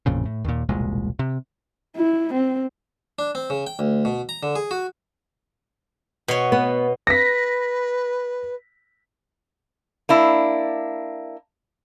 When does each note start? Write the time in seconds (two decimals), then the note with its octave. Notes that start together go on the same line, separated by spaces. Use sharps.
0.06 A1 F2 A#2 C#3
0.25 A2
0.45 D#2 A#2
0.69 E1 C2 A#2 G#3
1.19 C3
1.97 E4
2.34 C4
3.19 D4
3.35 C4
3.50 C#3
3.67 G5
3.79 D2
4.05 B2
4.29 A#5
4.43 D3
4.56 G#4
4.71 F#4
6.28 B2 C#5
6.52 B3
7.07 B4 A#6 B6
10.09 A#3 D4 E4